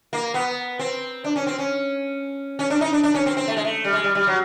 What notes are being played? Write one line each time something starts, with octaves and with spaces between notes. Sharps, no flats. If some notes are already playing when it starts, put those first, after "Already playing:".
A#3
B3
C4
D4
C#4
C4
C#4
C#4
D4
D#4
D4
D4
C#4
C4
C4
A3
G#3
A3
G3
G#3
G3
G3
F#3